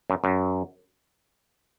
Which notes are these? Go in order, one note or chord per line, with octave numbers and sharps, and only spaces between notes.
F#2
F#2